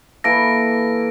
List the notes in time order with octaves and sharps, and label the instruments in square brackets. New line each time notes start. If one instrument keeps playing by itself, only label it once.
[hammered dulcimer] E3 A#3 A4 [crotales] A#6 D7